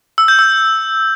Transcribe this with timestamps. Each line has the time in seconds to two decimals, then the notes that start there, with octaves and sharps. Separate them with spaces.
0.18 E6
0.28 G6
0.39 E6